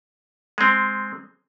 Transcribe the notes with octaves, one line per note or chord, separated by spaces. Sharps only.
G#3 C4